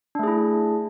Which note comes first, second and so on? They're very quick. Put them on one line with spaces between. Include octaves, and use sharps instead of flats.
D4 A3 G#4 E4